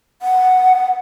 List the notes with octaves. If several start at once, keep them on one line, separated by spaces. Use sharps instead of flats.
F#5